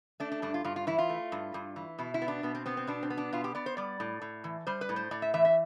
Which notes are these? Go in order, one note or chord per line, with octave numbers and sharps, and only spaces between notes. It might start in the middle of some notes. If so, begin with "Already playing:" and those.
A3 D4
D4
G2 D4
F4
G2 F4
F4
E3 E4
F4
A3
G2
G2
E3
B2 E4
E4
B3
D4
B2 B3
C4
B3 C4
C4
B2 D4
C4
B3
D4
B2 F4
G4
B3 D5
C5
G3 D5
A2
A2
E3
G3 C5
B4
A2
C5
A2 D5
E5
E3 E5
E5